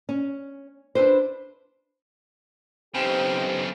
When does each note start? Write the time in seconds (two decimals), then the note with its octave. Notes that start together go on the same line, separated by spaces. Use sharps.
0.09 C#4
0.95 D4 E4 B4 C5
2.94 B1 C#3 C4 D#4 G4 C5